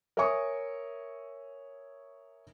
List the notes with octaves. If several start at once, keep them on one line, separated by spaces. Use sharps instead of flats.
A#4 C#5 E5 G#5 C#6 D#6